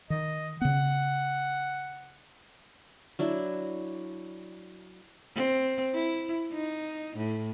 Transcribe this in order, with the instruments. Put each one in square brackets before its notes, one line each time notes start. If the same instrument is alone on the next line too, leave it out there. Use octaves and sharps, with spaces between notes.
[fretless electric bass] D#3 [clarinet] D#5
[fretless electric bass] C#3 B3 [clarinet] F#5
[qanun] F#3 D4 E4
[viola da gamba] C4
E4
D#4
A2